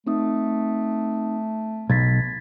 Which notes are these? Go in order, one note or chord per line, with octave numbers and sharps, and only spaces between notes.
A3 C4 D#4 D#6
B1 G#6 A6 B6